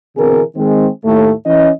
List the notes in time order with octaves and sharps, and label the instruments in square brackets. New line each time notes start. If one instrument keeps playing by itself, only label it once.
[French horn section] B2 D3 E3 C4 G#4 A#4
D#3 G#3 C4
D#2 A2 A3
E3 C#4 D#5